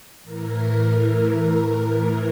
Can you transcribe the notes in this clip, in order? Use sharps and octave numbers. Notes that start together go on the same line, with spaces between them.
A2 E3 A#4